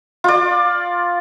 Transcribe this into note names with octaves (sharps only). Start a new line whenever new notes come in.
F4 D5